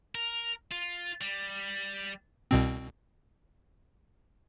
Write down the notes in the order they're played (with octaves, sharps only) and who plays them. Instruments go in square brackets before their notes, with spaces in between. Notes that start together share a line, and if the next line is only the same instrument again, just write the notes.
[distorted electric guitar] A#4
F4
G3
[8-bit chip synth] C2 B2 C4